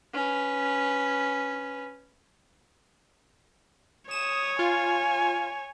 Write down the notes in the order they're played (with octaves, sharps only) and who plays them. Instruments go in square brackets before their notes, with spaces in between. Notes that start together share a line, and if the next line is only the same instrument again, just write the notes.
[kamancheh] C#4 B4
[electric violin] C#5 [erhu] D#6 [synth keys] E7
[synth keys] F4 [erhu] G#5